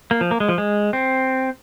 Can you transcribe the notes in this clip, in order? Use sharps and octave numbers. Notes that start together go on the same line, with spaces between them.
A#3
F3
A#3
G#3
F3
G#3
C4